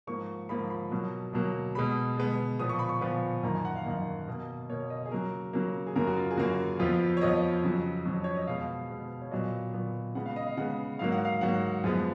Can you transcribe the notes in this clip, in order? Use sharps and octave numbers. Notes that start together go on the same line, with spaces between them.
G#2 F3 A#3 C#6
G#2 F3 A#3 B5
B5
B2 F#3 A#3
B2 F#3 A#3
B2 G#3 B3 B5
B2 G#3 B3
A#2 F3 B3 D#6
C#6
B5
C#6
A#2 F3 B3 B5
F#2 D#3 A#3 A#5
G#5
F#5
F5
F#2 D#3 A#3 D#5
B2 A#3
B2 A#3 C#5
D#5
G#4
C#3 F#3 A#3 A#4
C#3 F#3 A#3
G#4
F#2 C#3 F#3 A#3 A#4
F#4
F4
G#4
F#2 C#3 F#3 A#3 F#4
F2 F3 B3 F4
C#5
F2 F3 B3 D#5
F2 C#3 F#3
F2 C#3 F#3
C#5
D#5
B2 G#3 B3 F5
B2 G#3 B3
C#5
A#2 F#3 B3 D#5
A#2 F#3 B3
C#3 G#3 B3 F#5
F5
D#5
F5
C#3 G#3 B3 F#5
G#2 F#3 A#3 F5
F#5
F5
G#2 F#3 A#3 F#5
F#2 F3 G#3 B3